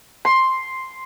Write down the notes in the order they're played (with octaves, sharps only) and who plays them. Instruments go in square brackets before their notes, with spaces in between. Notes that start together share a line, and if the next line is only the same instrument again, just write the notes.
[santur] C6